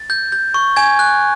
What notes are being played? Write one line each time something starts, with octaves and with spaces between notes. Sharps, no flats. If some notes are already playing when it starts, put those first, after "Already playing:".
Already playing: A6
G6
G6
C#6
G#5 G#6
F#6